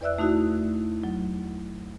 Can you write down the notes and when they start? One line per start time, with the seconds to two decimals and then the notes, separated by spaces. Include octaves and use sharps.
0.01 E2 B4 D5 E5 E6 F#6
0.18 A3 D#4 E4 F#4
1.03 F#3